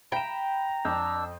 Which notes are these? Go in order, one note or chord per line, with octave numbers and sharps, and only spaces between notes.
G5 A#5 B5 E7
F2 D4 E6 G6